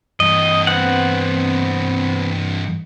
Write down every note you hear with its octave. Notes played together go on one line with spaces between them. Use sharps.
G2 E3 D#5
B3 C4 F#5